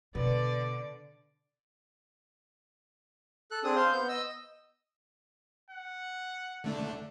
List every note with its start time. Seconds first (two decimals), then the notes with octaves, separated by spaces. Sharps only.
0.15 B2 D3 B3 D5
3.51 A4 F#6
3.64 C4 D4 G#4 D#6
3.76 C5 F5 C6
3.92 B3 G6
4.09 D#5 E6
5.70 F#5
6.64 D3 A3 D4